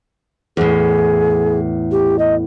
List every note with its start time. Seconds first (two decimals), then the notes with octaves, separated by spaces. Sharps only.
0.57 E2 A2 G#4
1.91 G4
2.19 D#5